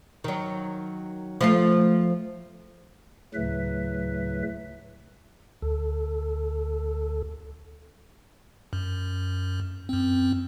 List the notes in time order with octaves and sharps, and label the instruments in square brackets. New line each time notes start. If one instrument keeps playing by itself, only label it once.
[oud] D#3 F#3
F3 A3 F4
[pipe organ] D2 A2 C#3 F#3 B4 E5
[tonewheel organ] D2 A4
[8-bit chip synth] F#2
F#2 C4